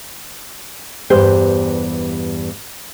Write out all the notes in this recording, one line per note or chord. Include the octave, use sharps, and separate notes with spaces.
E2 G2 G4 C5